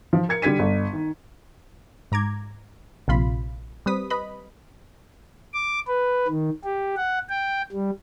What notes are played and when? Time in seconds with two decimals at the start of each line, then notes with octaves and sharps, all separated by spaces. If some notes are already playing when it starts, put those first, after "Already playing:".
0.13 F3
0.29 A#4 G#6 C#7
0.42 D3 G3 G#6 B6 D#7
0.59 G1
0.93 D#3
2.12 G#2 A#5 D6 G#6
3.08 A#1 C3 F4 B5 C6
3.86 G3 C4 B4 D#6 B6
4.10 B4 D#5 B5
5.53 D6
5.87 B4
6.28 D#3
6.64 G4
6.97 F#5
7.29 G5
7.72 G3